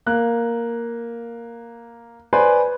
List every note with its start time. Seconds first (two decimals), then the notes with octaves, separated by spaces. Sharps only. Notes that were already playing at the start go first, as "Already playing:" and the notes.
0.06 A#3 F#6
2.33 B4 C5 D5 G#5 C6